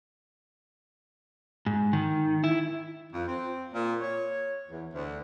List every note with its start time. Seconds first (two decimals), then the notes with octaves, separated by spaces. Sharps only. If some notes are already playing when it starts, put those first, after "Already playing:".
1.66 G#2
1.93 D#3
2.44 E4
3.13 F2
3.27 C4
3.73 A#2
4.01 C#5
4.68 E2
4.92 D2